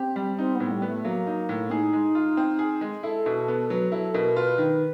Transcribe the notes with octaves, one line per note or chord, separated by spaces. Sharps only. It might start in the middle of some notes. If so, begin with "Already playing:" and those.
Already playing: C4 G4
G3
C4 D#4
A2 B3
G3
B3
A3
F#3 A#3
D#4
A2
D#4 G#4
G#3
F4
C4
G#4
G#3
E4 A4
B2
B3
F#3 B4
E4 A4
B2 A#4
F4 B4
D#3